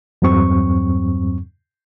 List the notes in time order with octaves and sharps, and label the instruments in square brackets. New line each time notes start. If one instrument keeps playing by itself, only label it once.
[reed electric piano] E2 G2 F#3 C4 C#6